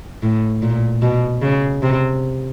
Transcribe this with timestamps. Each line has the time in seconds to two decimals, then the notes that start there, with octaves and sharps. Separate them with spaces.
0.23 A2
0.62 A#2
1.02 B2
1.42 C#3
1.83 C3